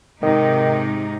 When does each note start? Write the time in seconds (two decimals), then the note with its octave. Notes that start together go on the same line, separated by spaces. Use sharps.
0.22 G#2 C3 D#3 D#4